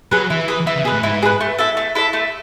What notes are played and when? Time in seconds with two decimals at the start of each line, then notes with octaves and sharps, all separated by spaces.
0.11 F#3 G#4 B4
0.30 E3 E4
0.48 G#4 B4
0.67 E3 E4
0.76 C#3
0.85 B2 G#4 B4
0.94 A2
1.03 G#2 E4
1.23 G#4 B4
1.40 A3
1.58 E4 A4 E5
1.77 A3
1.95 E4 A4 E5
2.13 A3